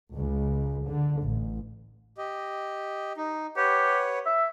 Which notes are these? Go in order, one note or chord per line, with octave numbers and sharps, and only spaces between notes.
C#2
D3
A1
G4 D#5
D#4
G4 B4 C#5 F#5
E5